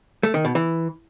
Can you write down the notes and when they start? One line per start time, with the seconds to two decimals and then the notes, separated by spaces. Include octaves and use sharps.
0.23 A3
0.34 D#3
0.45 B2
0.55 E3